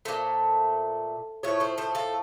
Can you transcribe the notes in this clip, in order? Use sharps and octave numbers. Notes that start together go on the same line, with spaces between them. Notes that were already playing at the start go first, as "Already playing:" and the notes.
A#2 F3 A3 A4 C5
A2 F3 A3 C#5
A4 C5
A4 C5
F4 A4